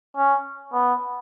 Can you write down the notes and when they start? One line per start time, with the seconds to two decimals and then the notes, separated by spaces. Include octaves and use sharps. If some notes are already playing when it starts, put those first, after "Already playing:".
0.16 C#4
0.73 B3